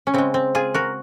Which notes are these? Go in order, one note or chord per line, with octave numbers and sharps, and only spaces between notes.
C#4
C#3 G#3 C4
C4
F4 G#4
F#4 A#4